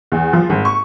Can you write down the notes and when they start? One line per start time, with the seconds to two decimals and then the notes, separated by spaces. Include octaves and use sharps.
0.12 E2
0.33 F3
0.50 G#1
0.65 C#6